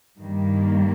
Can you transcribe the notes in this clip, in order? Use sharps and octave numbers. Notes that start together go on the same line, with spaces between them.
G2 D#3 G3 A#3